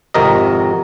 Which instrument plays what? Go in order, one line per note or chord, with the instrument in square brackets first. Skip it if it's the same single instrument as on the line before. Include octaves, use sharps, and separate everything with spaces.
[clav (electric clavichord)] G#1 F2 C3 A#4 D#5